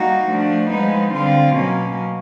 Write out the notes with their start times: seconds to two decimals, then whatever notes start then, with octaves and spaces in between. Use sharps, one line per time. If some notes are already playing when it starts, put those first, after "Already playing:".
Already playing: G3 A#3 D#4 F#4
0.27 F3 A3 D4
0.69 F3 G#3 B3 D#4
1.12 D3 G3 C4 F4
1.54 B2 F#3 A#3 C#4